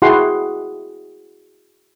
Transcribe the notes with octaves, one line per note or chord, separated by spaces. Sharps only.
E4 F#4 G#4 F#5 G5 C6